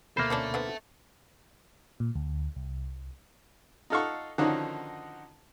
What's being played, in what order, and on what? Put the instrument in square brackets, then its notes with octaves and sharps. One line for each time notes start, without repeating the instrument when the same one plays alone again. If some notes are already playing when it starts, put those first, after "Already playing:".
[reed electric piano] D2 B2 B5 [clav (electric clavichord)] A#3 C5 [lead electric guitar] A4 E5
[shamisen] F3 C#4 D4
D3 B3 C4
[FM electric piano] A#2
D2
C2
[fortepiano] D#4 F4 A4 F5 F#5 C#6
D3 D#3 F3 C#4 D#4 F#4